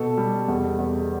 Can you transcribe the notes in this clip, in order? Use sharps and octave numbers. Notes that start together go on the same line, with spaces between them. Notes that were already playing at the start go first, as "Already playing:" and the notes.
Already playing: B2 A4
G3
E2
E2